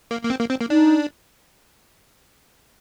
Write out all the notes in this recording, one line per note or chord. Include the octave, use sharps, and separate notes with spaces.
A#3
A#3
C4
A#3
C4
A#3
D4 D#4